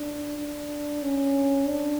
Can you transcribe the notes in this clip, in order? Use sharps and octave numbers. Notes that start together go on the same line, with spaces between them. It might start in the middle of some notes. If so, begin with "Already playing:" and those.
Already playing: D4
D4
C#4
D4